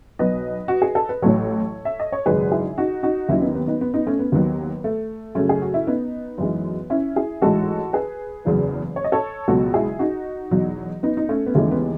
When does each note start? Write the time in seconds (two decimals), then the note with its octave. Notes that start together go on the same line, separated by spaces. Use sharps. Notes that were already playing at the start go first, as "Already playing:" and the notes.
0.19 B1 B2 F#3 B4 D#5
0.68 F#4
0.82 G#4
0.95 A4
1.09 B4
1.22 A1 A2 F#3 A4 C#5
1.85 E5
2.00 D#5
2.12 C#5
2.26 G#1 F#2 C#3 G#3 G#4 B4
2.52 E4 G#4
2.78 D#4 F#4
3.03 D#4 F#4
3.29 D#2 D#3 F#3 C#4 E4
3.42 B3 D#4
3.55 B3
3.68 B3 D#4
3.81 B3
3.94 B3 D#4
4.06 A3 C#4
4.19 B3
4.32 D#2 D#3 F#3 B3
4.84 A3
5.35 F#2 C#3 F#3 A3 C#4
5.49 G#4
5.62 F#4
5.74 E4
5.87 B3 D#4
6.38 F#2 E3 G#3
6.90 C#4 E4
7.16 E4 G#4
7.42 A1 G#2 E3 G#3 F#4 A4
7.93 G#4 B4
8.45 F#1 E2 C#3 F#3
8.96 C#5
9.04 D#5
9.12 A4 C#5
9.48 C#2 B2 F#3 F#4 A4
9.74 E4 G#4
9.99 D#4 F#4
10.51 E2 B2 F#3
11.03 B3 D#4
11.17 D#4
11.29 A3 C#4
11.46 B3
11.54 D#2 C#3 E3 G#3 A3 C#4
11.71 B3